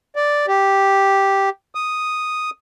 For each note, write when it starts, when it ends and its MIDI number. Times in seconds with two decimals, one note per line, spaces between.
0.16 0.46 74
0.47 1.49 67
1.75 2.50 87